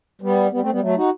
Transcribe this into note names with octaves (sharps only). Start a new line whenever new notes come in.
G3 B3
G3 B3
A3 C4
G3 B3
F#3 A3
D#4 F#4